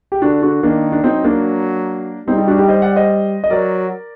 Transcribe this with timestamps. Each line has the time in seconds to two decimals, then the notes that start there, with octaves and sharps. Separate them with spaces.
0.12 G4
0.22 D3 D4 F#4
0.42 D4 F#4
0.63 D#3 A#3 D4
0.92 D4
1.04 F#3 C4 D#4
1.24 A#3 D4
2.27 G3 C4 D#4
2.38 D#4 G4
2.48 D4 F#4
2.58 D#4 G4
2.69 C5 D#5
2.82 D5 F#5
2.96 C5 D#5
3.44 D#5
3.50 F#3 A#4 D5